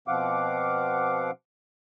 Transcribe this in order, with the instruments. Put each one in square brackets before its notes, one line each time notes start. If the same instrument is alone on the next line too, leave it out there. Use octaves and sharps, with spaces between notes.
[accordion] B2 F3 C4 F5 F#5 D6